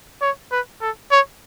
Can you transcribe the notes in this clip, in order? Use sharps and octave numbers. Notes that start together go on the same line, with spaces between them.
C#5
B4
A4
C#5